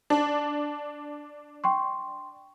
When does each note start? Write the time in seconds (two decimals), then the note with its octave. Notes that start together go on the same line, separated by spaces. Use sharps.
0.10 D4 A5
1.64 G5 C6 C#6